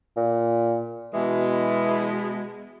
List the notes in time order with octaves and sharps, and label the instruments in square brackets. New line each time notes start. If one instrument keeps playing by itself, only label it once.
[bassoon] A#2
[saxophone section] B2 G#3 [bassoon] E3